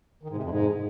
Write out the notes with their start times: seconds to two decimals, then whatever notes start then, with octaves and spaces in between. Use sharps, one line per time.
0.23 D#3
0.30 G#2
0.36 C3
0.43 F2
0.50 G#2